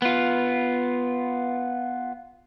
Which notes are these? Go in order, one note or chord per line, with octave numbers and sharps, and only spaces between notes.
B3 F4